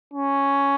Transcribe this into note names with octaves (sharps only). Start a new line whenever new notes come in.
C#4